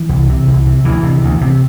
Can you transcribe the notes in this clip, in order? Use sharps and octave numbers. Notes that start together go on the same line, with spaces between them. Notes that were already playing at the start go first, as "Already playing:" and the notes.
Already playing: E3
C2
C3
C2
C3
D2 E3
C3
D2
C3